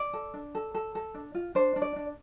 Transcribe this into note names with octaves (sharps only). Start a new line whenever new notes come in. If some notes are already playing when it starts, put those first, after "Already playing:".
Already playing: D5
A4
D4
A4
A4
A4
D4
F4
D4 C5
D4
D5
D4